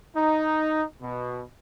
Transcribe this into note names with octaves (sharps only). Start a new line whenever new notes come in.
D#4
B2